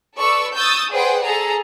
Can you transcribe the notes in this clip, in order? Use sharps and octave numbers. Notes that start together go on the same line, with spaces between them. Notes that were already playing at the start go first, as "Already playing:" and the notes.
A4 B4 D5 C#6 E6
C#6 D#6 E6 G6 A6
G#4 B4 C5 D5 F#5 G5
G#4 A4 A#5